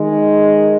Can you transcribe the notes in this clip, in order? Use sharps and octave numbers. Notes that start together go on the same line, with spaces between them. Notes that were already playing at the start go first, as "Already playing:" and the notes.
Already playing: D#3 G#3